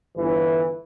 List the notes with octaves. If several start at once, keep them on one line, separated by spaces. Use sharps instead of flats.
G1 E3